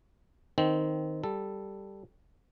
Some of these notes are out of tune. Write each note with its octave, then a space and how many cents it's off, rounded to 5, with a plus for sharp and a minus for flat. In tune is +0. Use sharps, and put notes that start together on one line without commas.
D#3 +0 C4 -10
G3 +0 A4 +0